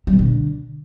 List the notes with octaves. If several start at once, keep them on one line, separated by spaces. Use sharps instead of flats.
G3
B2
D3